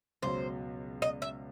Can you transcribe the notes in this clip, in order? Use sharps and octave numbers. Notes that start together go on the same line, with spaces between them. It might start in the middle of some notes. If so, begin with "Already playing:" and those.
C#2 B2 F#3 C5
D#5
E5